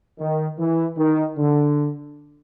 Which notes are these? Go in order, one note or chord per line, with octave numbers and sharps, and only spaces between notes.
D#3
E3
D#3
D3